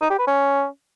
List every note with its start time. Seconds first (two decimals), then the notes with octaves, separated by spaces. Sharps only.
0.01 D#4
0.10 G4
0.18 B4
0.27 C#4